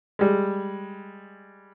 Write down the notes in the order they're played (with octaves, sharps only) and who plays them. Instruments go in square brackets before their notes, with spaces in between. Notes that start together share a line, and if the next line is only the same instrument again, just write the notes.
[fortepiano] G3 G#3